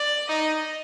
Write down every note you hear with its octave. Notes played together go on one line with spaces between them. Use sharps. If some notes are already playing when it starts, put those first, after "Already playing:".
Already playing: D5
D#4 D#5